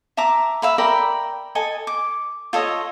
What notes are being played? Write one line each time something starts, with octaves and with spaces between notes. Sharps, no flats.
E5 A5 A#5 D6
E5 F5 B5
A#4 D5 G5 B5
A4 D#5 G#5
D6
F4 A4 C#5 D#5